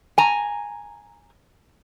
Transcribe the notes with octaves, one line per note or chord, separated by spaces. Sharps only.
G#5 A#5